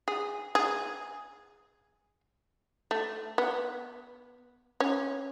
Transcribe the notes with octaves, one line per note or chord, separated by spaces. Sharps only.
G#4
G#4
A3
B3
C#4